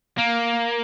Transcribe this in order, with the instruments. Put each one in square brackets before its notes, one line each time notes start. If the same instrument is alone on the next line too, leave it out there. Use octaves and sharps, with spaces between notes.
[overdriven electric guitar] A#3